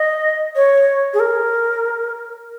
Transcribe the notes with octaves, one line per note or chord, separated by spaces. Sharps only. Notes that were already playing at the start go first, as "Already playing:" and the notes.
Already playing: D#5
C#5
G#4
A#4